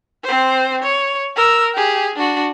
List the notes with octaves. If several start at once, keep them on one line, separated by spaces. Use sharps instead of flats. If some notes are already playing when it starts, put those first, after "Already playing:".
C4 C5
C#5
A#4 E6
G4 G#4
D4 F#4